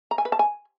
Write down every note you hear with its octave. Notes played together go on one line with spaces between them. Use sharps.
A#5
G#5
B4
A5
G#5